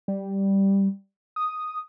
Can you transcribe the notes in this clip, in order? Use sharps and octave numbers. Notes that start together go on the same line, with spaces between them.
G3
D#6